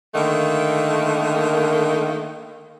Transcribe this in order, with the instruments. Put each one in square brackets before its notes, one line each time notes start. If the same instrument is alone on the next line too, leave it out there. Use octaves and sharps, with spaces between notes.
[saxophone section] D3 D#3 A3 A#3